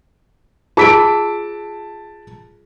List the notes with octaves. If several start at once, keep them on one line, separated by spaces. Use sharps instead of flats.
F4 G#4 A5 E6 B6 D7